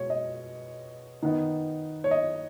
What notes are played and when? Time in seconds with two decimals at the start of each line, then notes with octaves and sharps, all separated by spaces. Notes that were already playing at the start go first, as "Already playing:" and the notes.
Already playing: B2 G#3 C#5
0.10 D#5
1.22 D#3 B3 D#4
2.04 C#5
2.11 D#5